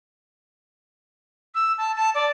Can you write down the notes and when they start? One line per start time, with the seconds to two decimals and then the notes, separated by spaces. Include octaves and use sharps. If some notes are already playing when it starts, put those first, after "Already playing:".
1.55 E6
1.78 A5
1.96 A5
2.15 D5